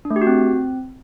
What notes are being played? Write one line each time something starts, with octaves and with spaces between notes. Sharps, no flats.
D4
A3
G4
F#4
C4